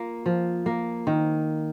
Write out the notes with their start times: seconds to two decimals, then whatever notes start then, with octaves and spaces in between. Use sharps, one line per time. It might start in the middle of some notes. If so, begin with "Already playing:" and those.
Already playing: A#3 F4
0.26 F3
0.66 A#3
1.07 D#3